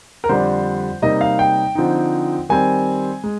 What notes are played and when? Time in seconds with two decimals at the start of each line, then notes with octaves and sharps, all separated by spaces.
0.24 A#4
0.29 F2 D3 G3 D4 C5
1.02 C3 G3 A#3 D#4 D#5
1.21 F5
1.39 G5
1.75 D3 F3 C4 D#4
2.49 D#3 G3 C4 G#5
3.24 G#3